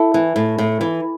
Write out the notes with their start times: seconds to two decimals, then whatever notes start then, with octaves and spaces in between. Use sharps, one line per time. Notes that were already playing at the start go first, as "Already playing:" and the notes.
Already playing: E4 A4
0.14 E3
0.36 A2
0.58 A2
0.81 E3